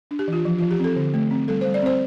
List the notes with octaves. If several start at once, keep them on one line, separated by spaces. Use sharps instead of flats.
D4
G4
E3 F4
F3
F4
F3
G4
C4 A4
D3
A3
C4
G3 A4
C5
G3
D5
C4 C5